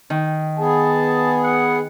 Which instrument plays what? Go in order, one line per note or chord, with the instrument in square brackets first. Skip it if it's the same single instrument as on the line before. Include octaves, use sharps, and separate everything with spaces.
[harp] D#3
[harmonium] B3 G#4 [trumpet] A5
[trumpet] F#5